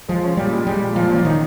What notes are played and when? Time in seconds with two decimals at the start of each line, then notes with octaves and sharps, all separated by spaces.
0.08 F3 G#3
0.24 C#4
0.37 A#2 G3
0.52 G#3
0.67 G3 G#3
0.82 A#2
0.96 A#2 F3
1.11 F3 C#4
1.25 D#3 D#4